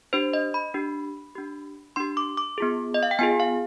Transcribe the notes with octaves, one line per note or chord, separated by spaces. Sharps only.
D4 G4 C5
D#5
B5
D4 G4
D4 G4
D4 G4 C6
D6
D6
B3 F4 G#4
D#5
F5
G5
B3 F4 G#4 G#5
F5